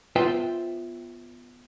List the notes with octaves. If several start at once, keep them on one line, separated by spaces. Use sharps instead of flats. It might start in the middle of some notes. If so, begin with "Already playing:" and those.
B3 F4 B4 C5 E5 G5